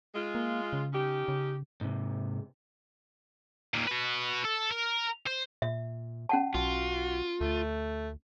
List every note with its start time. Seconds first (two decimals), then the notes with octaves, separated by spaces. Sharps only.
0.15 G#3 F4
0.35 A#3
0.73 C#3
0.93 C#4 D#4 G4
1.28 C#3
1.81 G#2 C3
3.74 D#2 A#2
3.87 F#4 B4
4.45 A4
4.71 A#4
5.27 C5
5.62 A#2 E5
6.29 C#4 F#5 A5
6.54 B1 F4 F#4
7.41 D2 A3